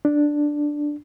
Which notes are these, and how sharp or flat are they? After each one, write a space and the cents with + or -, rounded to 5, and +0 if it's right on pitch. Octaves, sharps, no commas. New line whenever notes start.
D4 +5